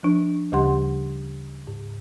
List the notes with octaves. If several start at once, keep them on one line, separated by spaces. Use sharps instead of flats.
F3 D4
D2 C#3 G3 G4 F#5 C6
G#2